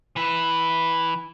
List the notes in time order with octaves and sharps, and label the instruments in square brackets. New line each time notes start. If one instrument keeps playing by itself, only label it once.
[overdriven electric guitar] E3 B4